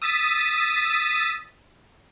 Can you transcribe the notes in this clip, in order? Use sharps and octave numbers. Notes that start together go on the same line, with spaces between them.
D#6 E6 A6 B6 D#7